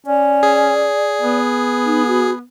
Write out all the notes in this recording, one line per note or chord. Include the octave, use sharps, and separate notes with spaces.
C#4 D5
G#4
B3
D#4
F#4